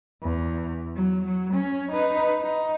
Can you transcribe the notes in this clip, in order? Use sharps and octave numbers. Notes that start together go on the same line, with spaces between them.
E2
F#3
F#3
C#4
D#4 B4
D#4